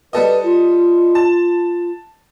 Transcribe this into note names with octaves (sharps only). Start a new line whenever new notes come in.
G3 A4 B4 D#5
F4
A5